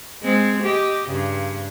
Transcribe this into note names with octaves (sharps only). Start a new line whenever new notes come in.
G#3 C4
G4 D#5
G2 C#3